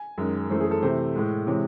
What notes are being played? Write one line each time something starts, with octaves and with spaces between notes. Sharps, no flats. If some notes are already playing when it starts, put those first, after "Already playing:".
Already playing: G#5
F#2 D#3 G#3
F#2 E3 A3 C5
G#4
A4
C3 E3 A3 C5
A2 G#3
C3 E3 G#3 C#5